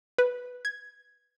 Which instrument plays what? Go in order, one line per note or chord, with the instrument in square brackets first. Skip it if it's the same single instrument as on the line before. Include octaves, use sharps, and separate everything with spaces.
[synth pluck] B4
G#6